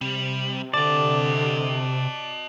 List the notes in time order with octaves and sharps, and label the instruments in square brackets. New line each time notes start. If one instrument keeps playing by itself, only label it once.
[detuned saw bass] C3 [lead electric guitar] G3
[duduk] D3 [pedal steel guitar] D5 [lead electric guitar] D#5 A5